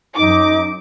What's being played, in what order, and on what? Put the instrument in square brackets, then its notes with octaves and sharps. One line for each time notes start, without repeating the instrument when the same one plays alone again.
[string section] F#2 D6 [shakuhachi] D#4